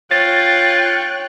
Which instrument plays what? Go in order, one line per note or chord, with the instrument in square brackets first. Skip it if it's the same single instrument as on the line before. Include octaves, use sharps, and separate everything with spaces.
[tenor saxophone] F4 [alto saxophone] C#5 [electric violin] G5 F#6 [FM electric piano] A6